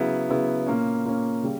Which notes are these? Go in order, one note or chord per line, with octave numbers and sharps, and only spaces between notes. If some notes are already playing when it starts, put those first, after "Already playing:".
Already playing: C#3 F#3 B3 E4
C#3 F#3 B3 E4
A#2 A#3 C#4
A#2 A#3 C#4
C#3 G3